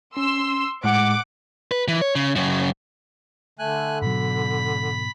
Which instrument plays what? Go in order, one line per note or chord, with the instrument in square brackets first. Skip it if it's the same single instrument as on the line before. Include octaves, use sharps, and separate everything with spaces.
[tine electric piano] C#4 [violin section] C6 E6
[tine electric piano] A2 [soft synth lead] G#3 [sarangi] F#5 [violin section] D6
[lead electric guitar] B4
E3
C#5
C#3
F#2 C#3
[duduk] D3 [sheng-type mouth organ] A3 G#5 F#6
[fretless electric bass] G#2 B2 F#3 [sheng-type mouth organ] B5